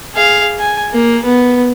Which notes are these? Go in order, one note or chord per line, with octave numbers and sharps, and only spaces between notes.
G#4 F5
G#5
A#3
B3